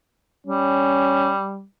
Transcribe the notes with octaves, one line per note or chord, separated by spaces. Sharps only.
G3 C#4